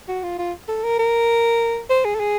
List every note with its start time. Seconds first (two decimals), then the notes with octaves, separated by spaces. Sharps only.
0.08 F#4
0.23 F4
0.38 F4
0.68 A4
0.84 A#4
0.99 A#4
1.90 C5
2.05 G#4
2.15 A4
2.20 G#4